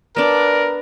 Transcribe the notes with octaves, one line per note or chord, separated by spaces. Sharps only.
B3 D4 A#4 D5